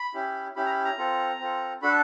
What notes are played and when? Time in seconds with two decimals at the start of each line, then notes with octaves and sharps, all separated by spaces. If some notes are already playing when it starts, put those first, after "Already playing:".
Already playing: B5
0.14 C#4 E4 G4
0.56 C#4 E4 G4 B5
0.66 A#5
0.70 B5
0.85 A#5
0.98 C4 F4 A4
1.40 C4 F4 A4
1.82 D4 F#4 A4 B5